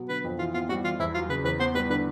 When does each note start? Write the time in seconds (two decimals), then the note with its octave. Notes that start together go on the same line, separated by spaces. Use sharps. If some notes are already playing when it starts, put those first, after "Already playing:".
Already playing: B2 F#3 B3
0.09 D3 B4
0.24 F2
0.39 E3 F4
0.54 B3 F4
0.69 G3 F#4
0.84 E3 F4
0.99 E2 E4
1.14 F#3 F4
1.29 C#3 B4
1.45 E2 B4
1.59 B3 C5
1.75 G3 B4
1.90 D3 B4